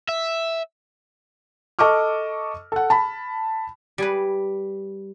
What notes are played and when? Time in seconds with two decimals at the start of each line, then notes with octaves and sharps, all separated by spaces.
0.09 E5
1.79 A4 D#5 C#6 D6 F6
2.72 A4 F#5
2.90 A5 B5
3.98 G3 G#4 B4